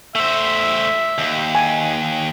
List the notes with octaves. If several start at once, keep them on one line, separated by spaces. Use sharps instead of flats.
A3 C5 E5
D#2
G#5